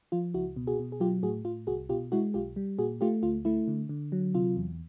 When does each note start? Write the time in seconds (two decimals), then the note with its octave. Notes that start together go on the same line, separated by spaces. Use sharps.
0.12 F3 F4
0.34 C#2 E4 F#4
0.56 B2
0.67 F#4 G#4
0.79 B2
0.92 G#4
1.00 F#3 F4 G4
1.23 A2 F#4 G#4
1.45 A2 F4
1.67 C2 F#4 G#4
1.89 B2 F4 G4
2.12 G#3 E4 F#4
2.34 B1 F4 G4
2.56 G3
2.78 A#2 F#4 G#4
3.01 A3 F4 G4
3.23 D2 F4
3.45 A3 E4
3.68 D3
3.89 D3
4.12 F#3
4.35 C3 F4
4.57 E2